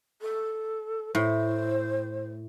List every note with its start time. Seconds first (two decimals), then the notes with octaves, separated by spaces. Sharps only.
0.21 A4
1.15 A2 C5